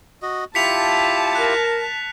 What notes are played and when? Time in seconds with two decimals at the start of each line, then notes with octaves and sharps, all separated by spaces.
0.22 F#4 D#5
0.55 E4 F4 G4 A5 B6 C#7 F7
1.35 A#4 F#6